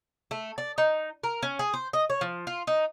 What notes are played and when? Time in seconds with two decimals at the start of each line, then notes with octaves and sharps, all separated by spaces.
0.31 A3
0.58 D5
0.78 D#4
1.23 A#4
1.43 C#4
1.59 G#4
1.74 C5
1.93 D#5
2.10 C#5
2.21 F3
2.47 F4
2.67 D#4